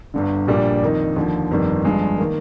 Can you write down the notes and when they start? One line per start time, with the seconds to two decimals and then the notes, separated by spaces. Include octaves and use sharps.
0.14 G1 G2 D3
0.48 A#1 A#2 G3 A#3 D4
0.82 F2 D#3 A#3 D#4
1.16 D#2 D3 F3
1.51 G1 F2 D#3 G3
1.85 G1 G2 F3 G#3
2.19 D#3 A#3